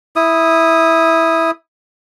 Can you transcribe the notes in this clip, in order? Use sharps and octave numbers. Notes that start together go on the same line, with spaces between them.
E4 D#6